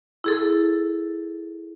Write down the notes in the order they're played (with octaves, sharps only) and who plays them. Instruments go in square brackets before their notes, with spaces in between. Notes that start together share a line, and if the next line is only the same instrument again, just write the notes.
[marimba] E4 G#4 A4